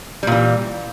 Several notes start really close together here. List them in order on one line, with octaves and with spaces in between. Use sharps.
G3 A#2 E3